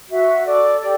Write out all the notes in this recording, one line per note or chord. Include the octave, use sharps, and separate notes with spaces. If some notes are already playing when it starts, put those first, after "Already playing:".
F#4 E5
A4 D5
G4 D5